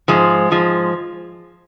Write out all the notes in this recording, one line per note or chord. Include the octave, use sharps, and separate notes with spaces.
G#2 F3 G#3
G#2 F3 G#3